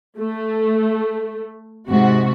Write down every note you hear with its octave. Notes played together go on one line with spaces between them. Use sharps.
A3
G#2 C3 F#4